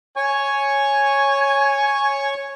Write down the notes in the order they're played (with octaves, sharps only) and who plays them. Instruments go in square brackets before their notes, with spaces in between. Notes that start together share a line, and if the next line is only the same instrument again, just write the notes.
[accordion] C#5 C#6 [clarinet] G#5